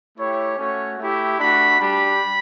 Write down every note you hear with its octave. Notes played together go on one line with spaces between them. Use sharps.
A3 E4 G4 C#5
A3 C#4 F#4 C#5
A3 E4 G4
A3 D4 F#4 B5
G3 D4 G4 B5